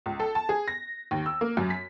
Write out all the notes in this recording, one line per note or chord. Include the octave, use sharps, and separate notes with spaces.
C#2
A4
A5
G#4
A#6
D#2
E6
A#3
F#2
B6